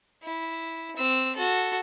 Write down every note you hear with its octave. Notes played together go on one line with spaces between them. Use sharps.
E4
C4 E6
F#4 A4